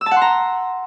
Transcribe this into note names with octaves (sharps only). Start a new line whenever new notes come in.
E6
A5
F#5
C6
A#5